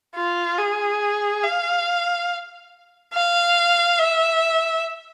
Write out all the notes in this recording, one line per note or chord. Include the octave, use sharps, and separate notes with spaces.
F4
G#4
F5
F5
E5